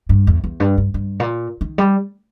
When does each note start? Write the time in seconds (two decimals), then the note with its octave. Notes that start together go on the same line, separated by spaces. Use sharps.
0.09 G2
0.27 E2
0.44 E2
0.60 G2
0.78 G2
0.94 G2
1.20 A#2
1.61 D#3
1.78 G3